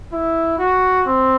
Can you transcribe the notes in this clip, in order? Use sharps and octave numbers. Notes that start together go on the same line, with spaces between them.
E4
F#4
C4